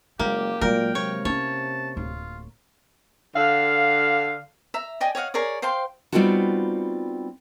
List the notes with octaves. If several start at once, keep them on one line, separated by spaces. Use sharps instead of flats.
F#1 G#3 A#3 G4
A#2 F#3 G#3 A#4 G5
C3 C#5
C#4 E4 C#5 A5
D1 F4
D3 F5
E5 A#5
D5 D#5 G5 G#5
C#5 D#5 F5 F#5
G#4 A#4 C#5 D5
C5 F5 G5 C6
G3 B3 C4 D#4 F4 F#4